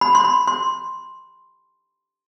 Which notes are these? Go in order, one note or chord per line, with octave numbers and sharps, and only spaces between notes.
B5
C6
B5
C6